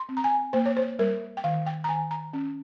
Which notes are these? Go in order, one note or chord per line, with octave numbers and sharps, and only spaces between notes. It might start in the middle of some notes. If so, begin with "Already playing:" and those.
Already playing: C6
C4
A#5
G#5
A#3 C5
C#5
C5
G3 A#4
G5
D#3 F5
G5
A#5
D#3 G#5
A#5
C#4